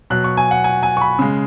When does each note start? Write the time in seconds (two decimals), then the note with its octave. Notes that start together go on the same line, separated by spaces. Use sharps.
0.10 B2 F#3 F#6
0.24 C#6
0.37 G#5
0.51 F#5
0.64 G#5
0.83 G#5
0.97 C#6
1.01 B5
1.19 C#3 G#3